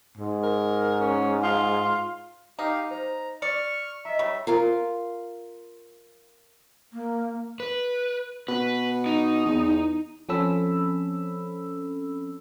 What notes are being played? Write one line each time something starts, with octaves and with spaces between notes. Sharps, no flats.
G#2
A#4
C#4
F4
D#4 G4 F5
C5 A#5
D5 C#6 F6 C#7
D#5 E5 A#5
G3 C#5 A#5 C#6
F4 A#4 F5
A#3
B4
B2 B4
D#4
E2
F3 C4 C#4 A4 B5 E6